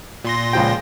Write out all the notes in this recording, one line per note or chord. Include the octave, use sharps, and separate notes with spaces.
A#2 C6 A#6
C#2 F3 G5